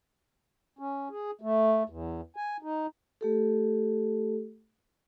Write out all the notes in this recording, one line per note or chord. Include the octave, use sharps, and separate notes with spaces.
C#4
G#4
A3
E2
G#5
D#4
A3 G4 A4